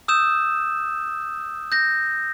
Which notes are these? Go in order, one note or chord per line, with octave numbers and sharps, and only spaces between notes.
D#6 E6 G6 E7
G6 A#6